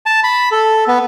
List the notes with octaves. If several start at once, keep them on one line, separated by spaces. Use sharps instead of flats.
A5
B5
A4
B3